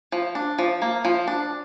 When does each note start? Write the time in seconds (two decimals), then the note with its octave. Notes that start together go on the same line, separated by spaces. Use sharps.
0.12 F3
0.35 D4
0.59 F3
0.82 A#3
1.05 F3
1.27 D4